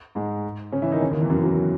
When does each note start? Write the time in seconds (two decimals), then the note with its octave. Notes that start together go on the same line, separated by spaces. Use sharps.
0.15 G#2 G#3
0.72 C#3 C#4
0.82 E3 E4
0.92 D#3 D#4
1.01 C#3 C#4
1.11 D#2 D#3
1.21 E2 E3
1.29 F#2 F#3
1.44 F#2 F#3